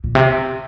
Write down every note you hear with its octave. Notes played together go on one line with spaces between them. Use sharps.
A#2
C3